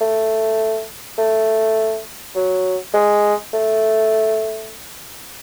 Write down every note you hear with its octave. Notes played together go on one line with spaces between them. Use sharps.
A3
A3
F#3
G#3
A3